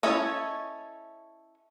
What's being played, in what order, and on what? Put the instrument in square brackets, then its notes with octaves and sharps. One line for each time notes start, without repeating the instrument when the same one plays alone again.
[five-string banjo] C#4 E4 A4 C#5 D#5